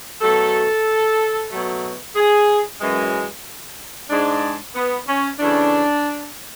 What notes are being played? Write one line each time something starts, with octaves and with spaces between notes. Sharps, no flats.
B2 F#3 A3 A4
B2 F#3 A3
G#4
F#2 E3 G#3
G#2 G#3 D4
B3
C#4
C#3 E3 A3 D4